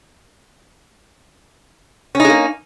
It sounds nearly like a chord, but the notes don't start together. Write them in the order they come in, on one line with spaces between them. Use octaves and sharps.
C#4 D#4 G#3 A#3